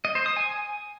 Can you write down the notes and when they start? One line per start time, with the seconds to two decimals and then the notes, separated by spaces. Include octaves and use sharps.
0.05 D#5
0.15 C5
0.26 D#6
0.37 G#5